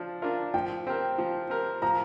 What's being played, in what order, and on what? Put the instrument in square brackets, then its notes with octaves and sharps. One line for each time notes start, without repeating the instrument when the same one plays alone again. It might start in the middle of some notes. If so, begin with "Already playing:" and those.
Already playing: [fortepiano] F3 D4
D4 F4 A#4
[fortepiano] F3 [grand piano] G5
[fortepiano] C4 G4 A#4
F3
C4 G4 A#4
[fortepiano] F3 [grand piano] A#5